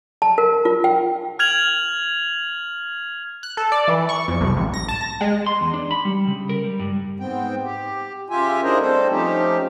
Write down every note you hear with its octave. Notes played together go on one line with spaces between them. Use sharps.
A5
A#4
F4
G5
F6 G#6 F7 F#7
F#6
A4
D5
E3
C#6
F2
C2
A1
A#6
A5
A#6
G#3
C6
E2
D4
B5
G3
C#3
A#4
G3
G2
G#2 B3 C4 G5
G4
C#3 F4 G4 E5 G#5
D4 E4 G#4 A#4 C5 D#5
G3 A3 C4 A4 C5
F3 A3 C#4 D#4 G4